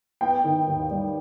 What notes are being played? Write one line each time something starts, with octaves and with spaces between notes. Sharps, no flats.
B3 G5
D#3
D#2
G3